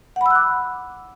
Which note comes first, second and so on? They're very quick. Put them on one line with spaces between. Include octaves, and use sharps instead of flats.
F#5 B5 E6 F#6 D6